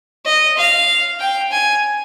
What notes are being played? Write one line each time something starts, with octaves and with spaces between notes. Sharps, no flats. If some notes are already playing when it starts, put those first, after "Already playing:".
D#5
F5
G5
G#5